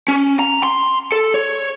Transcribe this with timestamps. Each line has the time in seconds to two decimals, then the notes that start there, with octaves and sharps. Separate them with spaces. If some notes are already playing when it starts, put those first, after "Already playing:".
0.08 C#4
0.39 A#5
0.63 C6
1.12 A4
1.34 C#5